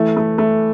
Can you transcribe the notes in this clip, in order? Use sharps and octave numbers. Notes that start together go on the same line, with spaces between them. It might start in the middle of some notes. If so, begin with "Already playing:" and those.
Already playing: E3 A3
A3
A3